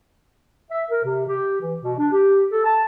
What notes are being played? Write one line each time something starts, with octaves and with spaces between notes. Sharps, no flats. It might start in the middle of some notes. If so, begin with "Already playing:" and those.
E5
A#4
C3
G4
E3
B2
D4
G4
A4
A5